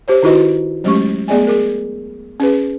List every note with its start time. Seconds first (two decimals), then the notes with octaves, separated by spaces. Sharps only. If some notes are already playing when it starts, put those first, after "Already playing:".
0.08 G4 C5 C#5
0.23 D#3 D#4 E4 F#4 B4 D#5
0.84 F#3 G#3 A3 C#4 G4 C#6
1.28 A3 B3 G#4 D5 D#5 G#5
1.47 G#4 A#4
2.40 C#4 G#4 B4